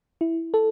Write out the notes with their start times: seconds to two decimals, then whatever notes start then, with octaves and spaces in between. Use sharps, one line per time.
0.21 E4
0.54 A4